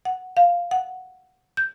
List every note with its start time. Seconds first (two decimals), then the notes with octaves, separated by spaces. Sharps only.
0.05 F#5
0.37 F5
0.71 F#5
1.57 G6